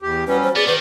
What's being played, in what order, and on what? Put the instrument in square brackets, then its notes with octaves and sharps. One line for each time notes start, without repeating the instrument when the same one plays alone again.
[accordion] E2 G4
[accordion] F#3 G3 C#4 [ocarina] B4
[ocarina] C5
[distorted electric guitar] B3 [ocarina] G#4 [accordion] D5
[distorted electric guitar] D#3 [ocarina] B4